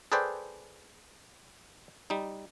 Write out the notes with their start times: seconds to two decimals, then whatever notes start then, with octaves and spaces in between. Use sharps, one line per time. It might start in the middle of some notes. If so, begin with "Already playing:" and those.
0.12 G#4 A4 B4 C5 D5 G5
2.10 G3 D#4